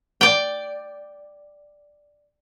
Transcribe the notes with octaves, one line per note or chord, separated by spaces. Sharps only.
D5 G5